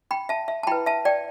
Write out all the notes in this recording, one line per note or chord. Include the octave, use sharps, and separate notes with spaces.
G5 B5
E5 A5
E5
A5
E4 B4 G5 B5
E5 A5
D5 G5